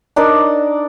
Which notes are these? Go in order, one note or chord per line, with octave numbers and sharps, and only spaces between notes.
D4 D#4 A#4 D5